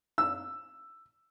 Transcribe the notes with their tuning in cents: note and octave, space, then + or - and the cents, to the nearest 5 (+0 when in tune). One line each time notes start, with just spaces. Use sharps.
E6 +5